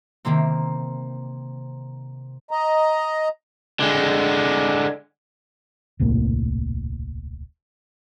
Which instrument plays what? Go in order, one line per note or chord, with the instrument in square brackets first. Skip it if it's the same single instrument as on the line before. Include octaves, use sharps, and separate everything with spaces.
[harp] C3 D#3 A#3 C4
[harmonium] D#5 A#5
[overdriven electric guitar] D3 G#3
[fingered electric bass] D#1 C2 A2 A#3